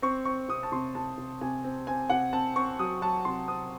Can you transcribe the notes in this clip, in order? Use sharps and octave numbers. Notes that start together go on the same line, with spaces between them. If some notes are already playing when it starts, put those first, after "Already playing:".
C4 C#6
C4 C#6
C3 D#6
A5
C3 C6
C3 A5
C3
C3 G#5
C4
C4 G#5
C3 F#5
C4 A5
C4 C#6
F#3 D#6
F#3 A5
C3 C6
C4 D#6